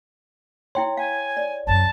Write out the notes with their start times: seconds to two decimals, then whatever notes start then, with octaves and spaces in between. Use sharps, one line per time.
0.75 E4 C#5 G5 C6
0.97 F5 G#5
1.37 D5
1.67 C2 F#2 A5